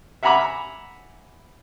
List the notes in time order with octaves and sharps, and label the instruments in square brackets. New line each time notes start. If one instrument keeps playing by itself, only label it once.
[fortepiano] E5 F#5 G#5 A#5 B5 D6